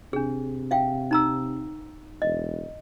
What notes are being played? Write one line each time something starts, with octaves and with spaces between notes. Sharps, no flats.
C3 D4 G#4
E5 F5 G5
D#4 A#5 E6
E1 D#5